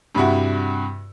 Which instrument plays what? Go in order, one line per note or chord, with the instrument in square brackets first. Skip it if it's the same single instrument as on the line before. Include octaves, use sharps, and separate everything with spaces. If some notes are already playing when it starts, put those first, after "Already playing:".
[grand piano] G2 C3 E4 F#4